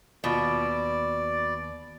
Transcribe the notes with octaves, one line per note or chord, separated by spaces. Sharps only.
D#2 B2 F4 D5